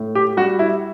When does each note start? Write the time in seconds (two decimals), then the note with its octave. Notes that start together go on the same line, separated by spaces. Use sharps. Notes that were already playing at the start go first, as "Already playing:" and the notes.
Already playing: A2
0.15 G4
0.37 G3 F#4
0.59 E4